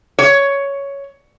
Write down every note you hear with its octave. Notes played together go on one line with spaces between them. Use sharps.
C#5